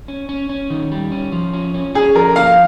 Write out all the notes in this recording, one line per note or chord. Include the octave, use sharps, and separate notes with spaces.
C#4
C#4
C#4
D#3
G3
C#4
F3
C#4
C#4
C#4 G#4
F3 A#4
A#3 F5